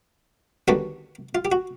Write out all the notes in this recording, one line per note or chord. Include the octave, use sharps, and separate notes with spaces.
D#2 D3 G3 B3 D4 F#4
F4
G4
F#4